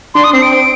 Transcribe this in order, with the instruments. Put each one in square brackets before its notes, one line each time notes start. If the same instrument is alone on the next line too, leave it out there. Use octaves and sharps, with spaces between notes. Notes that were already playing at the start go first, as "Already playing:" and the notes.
[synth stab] D4 [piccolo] C6
[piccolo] D#6
[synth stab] C4 [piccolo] C7
[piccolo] D7
[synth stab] C4